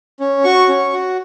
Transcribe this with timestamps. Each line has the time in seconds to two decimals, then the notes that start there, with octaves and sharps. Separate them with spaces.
0.20 C#4
0.44 F#4 C#6
0.69 C#4
0.93 F#4